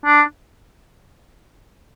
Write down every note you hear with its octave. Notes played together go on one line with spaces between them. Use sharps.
D4